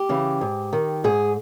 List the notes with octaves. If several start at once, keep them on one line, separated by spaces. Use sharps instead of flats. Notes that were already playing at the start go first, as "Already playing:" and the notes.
Already playing: G4
C#3 E3
G#2
D#3
G#2 G#4